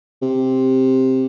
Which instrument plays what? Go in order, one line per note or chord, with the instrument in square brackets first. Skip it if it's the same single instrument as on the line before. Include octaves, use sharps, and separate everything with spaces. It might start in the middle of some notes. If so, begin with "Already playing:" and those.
[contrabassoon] C3